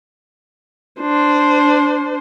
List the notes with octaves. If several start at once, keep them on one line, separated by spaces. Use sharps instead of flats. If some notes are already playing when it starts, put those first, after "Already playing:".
D4 C5